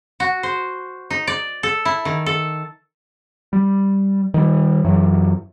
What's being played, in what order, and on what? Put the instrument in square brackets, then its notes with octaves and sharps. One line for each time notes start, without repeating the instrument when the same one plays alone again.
[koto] F#4
C5
D#4
D5
A4
E4
D#3
A4
[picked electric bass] G3
D#3 G3
F#2 E3 F#3